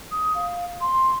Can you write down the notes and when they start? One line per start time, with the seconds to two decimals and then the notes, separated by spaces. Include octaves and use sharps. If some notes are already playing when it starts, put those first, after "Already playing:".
0.11 D#6
0.35 F5
0.81 C6